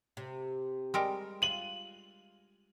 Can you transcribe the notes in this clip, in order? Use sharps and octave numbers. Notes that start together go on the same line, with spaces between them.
C3
G3 G#3 A#4
F4 D#7 F#7